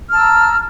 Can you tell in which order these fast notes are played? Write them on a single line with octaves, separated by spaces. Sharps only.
F6 A5 E6 A#5